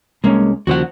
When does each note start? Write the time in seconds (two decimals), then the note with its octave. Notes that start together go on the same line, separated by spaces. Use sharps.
0.24 C2 G#3 A#3 C#4
0.67 D#2 C#3 F3 F#4 C5 F#5